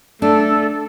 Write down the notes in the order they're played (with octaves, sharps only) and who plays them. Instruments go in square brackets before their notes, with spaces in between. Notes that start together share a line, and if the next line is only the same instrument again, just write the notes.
[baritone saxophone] A3 [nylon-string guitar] D4 [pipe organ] A4